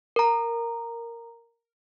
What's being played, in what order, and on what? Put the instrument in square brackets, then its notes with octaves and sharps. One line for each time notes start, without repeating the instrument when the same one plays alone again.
[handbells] A#4 A#5